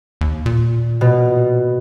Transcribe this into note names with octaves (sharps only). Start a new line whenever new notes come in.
D#2
A#2
B2